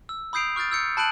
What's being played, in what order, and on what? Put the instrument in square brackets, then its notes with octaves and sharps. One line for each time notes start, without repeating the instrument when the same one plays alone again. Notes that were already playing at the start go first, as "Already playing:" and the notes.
[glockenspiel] E6
B5 D#6 G6 C7 D7 F7
C#6 F6 G6 A6 D7
E6 G6 C#7
A5 B5 F#6 D7 D#7 F#7